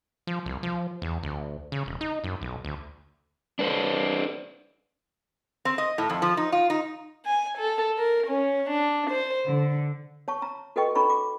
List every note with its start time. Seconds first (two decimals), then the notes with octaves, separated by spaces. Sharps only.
0.27 F3
0.46 C2
0.63 F3
1.02 E2
1.23 D2
1.72 C#3
1.86 E1
2.01 D#4
2.24 F#2
2.42 B1
2.65 D2
3.59 D4 B4 C5
5.65 C4
5.78 D#5
5.98 A2
6.10 F2
6.22 F3
6.37 D#4
6.52 F4
6.70 D#4
7.26 G#5
7.57 A4
7.97 A#4
8.26 C#4
8.68 D4
9.10 C5
9.47 D3
10.28 C#5 A5 C#6
10.42 A#5
10.76 F#4 A4 B4 D#5 G5 C#6
10.95 D#4 A4 C#5 A#5 B5 C#6
11.09 D6